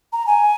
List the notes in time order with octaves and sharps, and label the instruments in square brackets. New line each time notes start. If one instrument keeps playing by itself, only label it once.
[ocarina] A#5
G#5